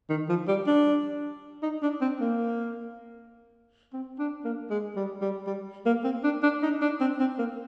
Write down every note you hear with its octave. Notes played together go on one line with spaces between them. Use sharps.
D#3
F3
G3
D4
D#4
D4
C4
A#3
C4
D4
A#3
G#3
G3
G3
G3
A#3
C4
D4
D4
D#4
D4
C4
C4
A#3